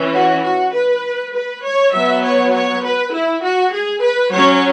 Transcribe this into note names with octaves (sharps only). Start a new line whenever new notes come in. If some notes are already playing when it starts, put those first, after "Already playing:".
Already playing: E3 C#4
F#4
F#4
B4
B4
C#5
F#3 B3 E5
C#5
C#5
B4
E4
F#4
G#4
B4
F#3 C#4 C#5